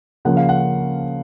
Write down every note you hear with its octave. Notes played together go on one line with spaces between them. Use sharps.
C#3 F3 A#3 C#4 F#5
F5
F#5